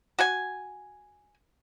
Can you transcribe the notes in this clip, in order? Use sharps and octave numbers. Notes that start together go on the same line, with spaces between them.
F#4 F#5 G#5